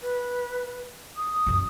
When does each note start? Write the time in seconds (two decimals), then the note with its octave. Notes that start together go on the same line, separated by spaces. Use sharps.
0.01 B4
1.17 D#6
1.46 F#2 A#2